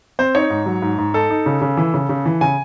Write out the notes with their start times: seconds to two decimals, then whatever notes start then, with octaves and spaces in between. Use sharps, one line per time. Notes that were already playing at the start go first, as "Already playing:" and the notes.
0.19 C4 C5
0.35 D#4 C#5
0.50 G#2
0.66 F#3
0.82 G#2
0.98 G#2
1.14 D#4 A4
1.30 D#4
1.46 C#3
1.62 C#3
1.77 E3
1.94 C#3
2.09 C#3
2.26 E3
2.41 C#3 G#5